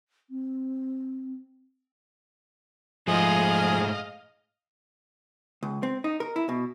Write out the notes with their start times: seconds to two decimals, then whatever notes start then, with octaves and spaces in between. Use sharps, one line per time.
0.30 C4
3.08 G#2 F3 G#3 A3 G#4 D#5 F5
5.63 C#2
5.83 C4
6.04 D#4
6.20 A#4
6.36 E4
6.49 B2